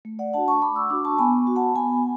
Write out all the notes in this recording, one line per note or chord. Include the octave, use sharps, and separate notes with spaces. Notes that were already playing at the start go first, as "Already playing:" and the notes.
A3
D5 F#5
D4 F#4 F#5 A5
A5 C#6
A3 B5 D6
C#6 E6
D4 F#4 B5 D6
A5 C#6
B3 G#5 B5
F#4
F#5 A5
B3 G#5 B5